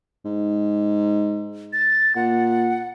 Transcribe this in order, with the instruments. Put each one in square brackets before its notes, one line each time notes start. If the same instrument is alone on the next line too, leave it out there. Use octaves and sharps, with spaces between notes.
[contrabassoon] G#2
[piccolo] A6
[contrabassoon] A#2 [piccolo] F#5